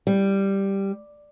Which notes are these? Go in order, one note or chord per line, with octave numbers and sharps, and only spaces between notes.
G3